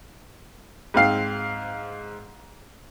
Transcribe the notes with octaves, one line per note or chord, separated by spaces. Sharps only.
G#2 C4 F5 C7